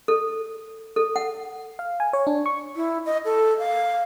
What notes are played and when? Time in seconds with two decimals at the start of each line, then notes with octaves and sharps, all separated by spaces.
0.08 A4
0.96 A4
1.16 F#5
1.79 F5
2.00 G#5
2.13 C#5
2.27 D4
2.46 C#6
2.76 E4
3.06 D#5
3.25 A4
3.59 F5